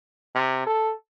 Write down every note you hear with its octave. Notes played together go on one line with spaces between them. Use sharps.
C3
A4